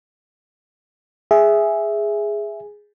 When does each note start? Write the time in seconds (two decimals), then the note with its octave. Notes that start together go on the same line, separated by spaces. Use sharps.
1.31 G#4 E5